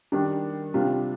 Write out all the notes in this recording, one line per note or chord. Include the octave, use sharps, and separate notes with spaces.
D#3 G3 D4
C3 G3 D4 F4